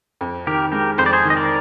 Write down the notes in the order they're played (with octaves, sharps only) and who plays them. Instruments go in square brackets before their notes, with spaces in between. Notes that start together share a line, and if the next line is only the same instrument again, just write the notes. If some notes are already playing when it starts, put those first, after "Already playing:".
[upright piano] F2
[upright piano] D#3 [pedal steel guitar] G4 A#4
[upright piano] G#3 [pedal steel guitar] G4 A#4
[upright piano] F2 [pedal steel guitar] C5
[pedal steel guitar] D5
G#4 C5
[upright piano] D#3
[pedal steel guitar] D#5
A#4 D5